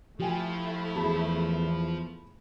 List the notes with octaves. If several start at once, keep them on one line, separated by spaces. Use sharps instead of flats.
F3 A3 E4 G4 G5 G#5
E2 G#4 A5 B5